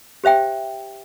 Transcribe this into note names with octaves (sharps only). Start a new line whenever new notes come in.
G4 C5 E5 G5